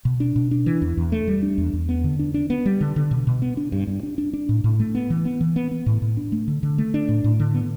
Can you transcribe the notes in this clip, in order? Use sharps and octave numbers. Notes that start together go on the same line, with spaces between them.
B2
D4
B2
D4
E3
E2
E2
A3
G3
D4
E2
E2
B3
D3
D4
D4
B3
G3
D3
D3
B2
B2
B3
D4
G2
G2
D4
D4
D4
A2
A2
A3
B3
E3
B3
E3
B3
B3
A2
A2
D4
A3
D3
D3
A3
D4
A2
A2
D3
B3